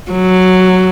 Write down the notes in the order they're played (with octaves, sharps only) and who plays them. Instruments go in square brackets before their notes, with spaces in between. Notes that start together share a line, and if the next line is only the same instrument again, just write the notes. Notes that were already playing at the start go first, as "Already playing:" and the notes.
[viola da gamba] F#3